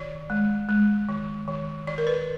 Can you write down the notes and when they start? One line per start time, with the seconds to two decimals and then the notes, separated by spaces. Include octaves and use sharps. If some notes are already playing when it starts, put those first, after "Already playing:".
Already playing: D#3 D5
0.30 G#3
0.69 G#3
1.09 D#3
1.48 D#3
1.87 D#3 D5
1.98 A#4
2.07 B4